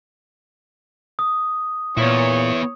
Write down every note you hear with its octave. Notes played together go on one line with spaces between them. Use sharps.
D#6
A#2 B3 E4 C#5